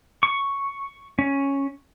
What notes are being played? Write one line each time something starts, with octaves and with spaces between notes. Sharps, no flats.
C#6
C#4